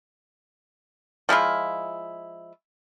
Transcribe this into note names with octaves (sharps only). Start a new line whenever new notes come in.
F3 G#3 E4 F4